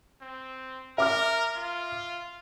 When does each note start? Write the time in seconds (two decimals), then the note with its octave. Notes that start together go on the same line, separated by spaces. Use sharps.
0.22 C4
0.98 A#4 E5 D6 F6
1.56 F4